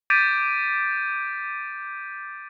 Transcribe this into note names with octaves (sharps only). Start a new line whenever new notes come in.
D6 G6 A6 B6 D7 D#7